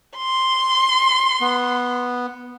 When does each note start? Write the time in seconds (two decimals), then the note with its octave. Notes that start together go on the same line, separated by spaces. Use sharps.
0.16 C6
1.41 B3